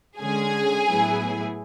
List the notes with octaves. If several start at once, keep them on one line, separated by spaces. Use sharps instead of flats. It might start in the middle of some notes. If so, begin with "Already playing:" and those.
D3 G#3 C#4 G#4 G#5
A2 F#3 B3 E4